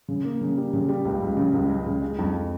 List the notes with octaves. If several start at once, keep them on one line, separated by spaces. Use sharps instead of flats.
C#3
A#3
C#3
G3
C#3
G3
C#2
C#2
C#3
C#2
C#2
C#3
G#3
F2